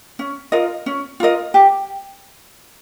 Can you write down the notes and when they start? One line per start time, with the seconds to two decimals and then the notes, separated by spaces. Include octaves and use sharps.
0.19 C#4
0.52 F4 A#4 D#5
0.86 C#4
1.20 F4 A#4 D#5
1.54 G4